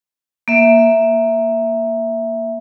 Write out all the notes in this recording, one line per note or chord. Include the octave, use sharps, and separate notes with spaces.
A#3 E5